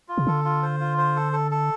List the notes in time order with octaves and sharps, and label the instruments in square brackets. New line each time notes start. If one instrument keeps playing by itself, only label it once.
[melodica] F4
[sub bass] C3
[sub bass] D3 [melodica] A4
[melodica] F4
C5
F4
C5
A4
A4
A4